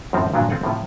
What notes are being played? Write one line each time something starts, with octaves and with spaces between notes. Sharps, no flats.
F#2 A2 F3 C4
G2 A#2 F3 F#3 D4
C4 F4 A4 F#5 G#5
A2 C3 F3